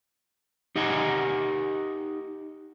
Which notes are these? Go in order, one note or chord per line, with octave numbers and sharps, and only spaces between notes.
D#4 G4 D#5 F#5 G#5 A#5